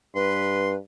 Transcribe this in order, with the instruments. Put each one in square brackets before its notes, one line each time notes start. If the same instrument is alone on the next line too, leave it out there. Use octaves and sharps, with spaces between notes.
[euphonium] G2 [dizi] B4 [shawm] C6